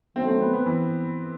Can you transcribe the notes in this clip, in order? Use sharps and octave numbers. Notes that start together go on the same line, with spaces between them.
D#3 F#3 A3 C4
C4
B3
B3
E3